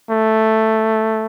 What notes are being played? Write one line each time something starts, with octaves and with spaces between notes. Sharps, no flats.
A3